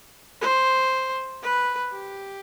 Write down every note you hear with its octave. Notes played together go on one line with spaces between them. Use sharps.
C5
B4
G4